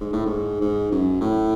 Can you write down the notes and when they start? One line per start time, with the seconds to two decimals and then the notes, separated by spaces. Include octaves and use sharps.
0.01 G#2
0.13 A2
0.26 G#2
0.61 G#2
0.92 F#2
1.21 A2